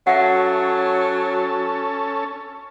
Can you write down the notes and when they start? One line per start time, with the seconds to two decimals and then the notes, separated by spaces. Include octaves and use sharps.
0.07 F#3 C#4 A4 E5 F#5